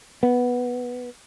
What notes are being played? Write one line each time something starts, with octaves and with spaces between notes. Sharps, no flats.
B3